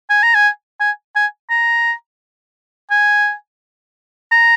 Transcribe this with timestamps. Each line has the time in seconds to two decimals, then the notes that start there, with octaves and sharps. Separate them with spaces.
0.10 G#5
0.23 A#5
0.35 G#5
0.80 G#5
1.16 G#5
1.50 A#5
2.91 G#5
4.32 A#5